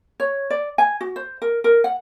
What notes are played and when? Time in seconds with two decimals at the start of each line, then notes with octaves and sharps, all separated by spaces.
0.20 C#5
0.50 D5
0.78 G#5
1.01 F#4
1.16 C5
1.42 A#4
1.64 A#4
1.84 F#5